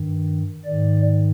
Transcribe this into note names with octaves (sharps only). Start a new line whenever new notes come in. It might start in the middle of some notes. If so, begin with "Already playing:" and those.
Already playing: G2 D#3
G#2 D#3 D5